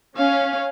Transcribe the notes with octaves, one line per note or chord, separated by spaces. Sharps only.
C#4 F5